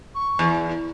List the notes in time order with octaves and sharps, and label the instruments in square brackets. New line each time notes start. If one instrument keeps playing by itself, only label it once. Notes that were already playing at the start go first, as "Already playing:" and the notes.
[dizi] C#6
[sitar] E2
[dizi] E4